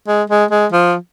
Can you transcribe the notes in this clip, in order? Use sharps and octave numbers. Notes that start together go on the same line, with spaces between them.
G#3
G#3
G#3
F3